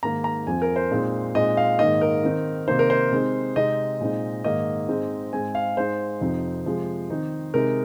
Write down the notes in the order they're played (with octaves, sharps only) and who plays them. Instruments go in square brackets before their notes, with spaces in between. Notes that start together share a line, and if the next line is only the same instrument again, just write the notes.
[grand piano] G#2 D#3 A#3 A#5
A#5
F2 F3 C4 G#5
A#4
C5
A#2 G#3 C4 D#4
A#2 G#3 C4 D#4 D#5
F5
G#2 D#3 A#3 D#4 D#5
A#4
D#3 C4 D#4
C3 D#3 A#3 D#4 C5
A#4
C5
C3 G#3 C4 D#4
C3 G#3 C4 D#4 D#5
A#2 G#3 C4 D#4
G#2 D#3 A#3 D#4 D#5
G#2 G#3 C4 D#4
G#2 G#3 C4 G#5
F5
G#2 G#3 D#4 C5
F2 C3 F3 C4 D#4
C3 F3 G#3
D#3 C4 D#4
C3 G#3 D#4 A#4